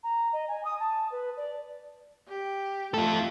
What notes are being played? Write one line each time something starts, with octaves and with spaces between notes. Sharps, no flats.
A#5
D#5
G#5
D#6
A5
B4
D5
G4
A3 F4 A4